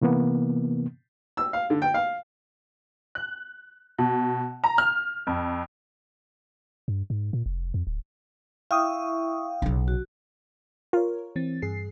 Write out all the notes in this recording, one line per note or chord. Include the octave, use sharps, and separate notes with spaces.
C3 E3 A#3 B3
E6
F5
D3
G5
F5
F#6
B2
A#5
F6
F2
G2
G#2
A#2
F1
F2
D1
E4 E5 F5 G5 C#6 D#6
B1 C#3
F#4
F4 A#4 C#5
E3 C4 A6
G2 G#4 C7